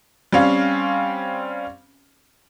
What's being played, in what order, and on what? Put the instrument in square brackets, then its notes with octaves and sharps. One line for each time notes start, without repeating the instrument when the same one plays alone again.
[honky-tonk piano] G3 C4 C#4 F5